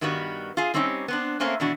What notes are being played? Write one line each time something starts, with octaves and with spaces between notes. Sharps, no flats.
G2 D#3 G3 B3 F#4
F4 G#4
G3 C4 C#4 D#4 F#4 G4
B3 C4 D4
A3 A#3 C4 C#4 A#4
B2 E3 D4 F#4